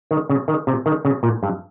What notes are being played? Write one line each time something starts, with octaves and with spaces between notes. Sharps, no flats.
D#3
C#3
D#3
C3
D#3
C#3
A#2
G2